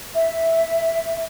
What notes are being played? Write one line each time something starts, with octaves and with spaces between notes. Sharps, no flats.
E5